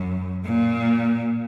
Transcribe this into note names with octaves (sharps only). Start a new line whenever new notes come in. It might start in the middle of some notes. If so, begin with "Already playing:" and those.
Already playing: F#2
A#2